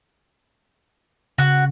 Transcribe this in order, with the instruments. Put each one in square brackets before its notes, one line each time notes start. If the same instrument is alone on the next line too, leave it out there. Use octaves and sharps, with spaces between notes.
[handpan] C#3 [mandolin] F#4